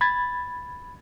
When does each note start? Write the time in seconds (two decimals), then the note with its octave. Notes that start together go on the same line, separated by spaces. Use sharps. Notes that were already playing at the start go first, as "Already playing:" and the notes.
0.01 B5 G#6 A6